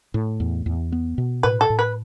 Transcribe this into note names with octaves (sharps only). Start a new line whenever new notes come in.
A2
E2
E2
B3
B2
A2 B4
A4
A2
B4